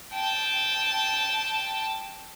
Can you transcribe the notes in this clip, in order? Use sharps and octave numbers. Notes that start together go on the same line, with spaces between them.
G5 A5